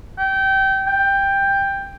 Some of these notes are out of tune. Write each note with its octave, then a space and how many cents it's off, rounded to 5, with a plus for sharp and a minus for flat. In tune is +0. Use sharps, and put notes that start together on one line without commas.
G5 -20
G5 +10